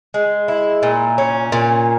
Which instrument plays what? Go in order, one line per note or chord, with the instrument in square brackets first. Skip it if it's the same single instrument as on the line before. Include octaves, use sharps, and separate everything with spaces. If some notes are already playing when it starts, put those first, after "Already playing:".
[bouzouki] G#3
E4
A#2
C#4
A#2